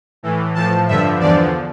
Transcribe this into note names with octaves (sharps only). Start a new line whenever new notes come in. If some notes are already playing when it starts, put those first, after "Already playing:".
A2 E3
A2 F3 A5
G2 D3 F3 E5
E2 D3 F3 D5